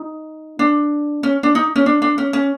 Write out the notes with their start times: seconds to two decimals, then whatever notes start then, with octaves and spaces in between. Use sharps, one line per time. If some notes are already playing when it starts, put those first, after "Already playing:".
Already playing: D#4
0.59 D4
1.23 C#4
1.43 D4
1.55 D#4
1.76 C#4
1.86 D4
2.02 D4
2.18 C#4
2.33 C#4